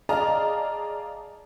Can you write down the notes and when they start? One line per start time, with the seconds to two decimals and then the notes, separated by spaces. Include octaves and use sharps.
0.09 G#4 D5 D#5 F5 A5 A#5